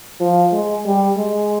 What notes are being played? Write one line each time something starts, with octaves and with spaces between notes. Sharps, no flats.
F3
G#3
G3
G#3